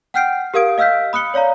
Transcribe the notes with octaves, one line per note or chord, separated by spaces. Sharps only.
F#5 G5 F6 G6 C7 D7
G4 A#4 F5 D#6 G#6 D7
D#5 F5 E6 F6 G6 B6
B5 D#6 F#6 C#7 G7
C#5 D5 F5 A#5